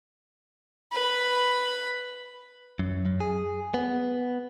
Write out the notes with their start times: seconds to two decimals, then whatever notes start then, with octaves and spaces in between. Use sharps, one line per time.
0.93 B4 B5
2.79 F#2
3.05 F#2
3.20 G#4
3.74 B3